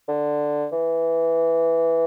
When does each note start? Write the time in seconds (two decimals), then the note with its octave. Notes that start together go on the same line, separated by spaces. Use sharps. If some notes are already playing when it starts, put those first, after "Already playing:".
0.09 D3
0.72 E3